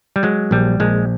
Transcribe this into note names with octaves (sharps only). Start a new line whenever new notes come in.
G3
F#3 G#3
A#1 G3
A#1 G#3